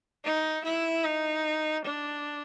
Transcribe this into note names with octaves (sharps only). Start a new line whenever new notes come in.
D#4
E4
D#4
D4